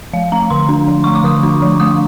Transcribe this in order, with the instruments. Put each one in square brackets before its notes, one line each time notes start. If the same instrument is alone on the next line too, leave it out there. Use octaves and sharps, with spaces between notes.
[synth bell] F3 F5
A3 A#5
D3 C6
D4
F3
A3 C#6
D6
D3 D#6
D4
F3
A3 D#6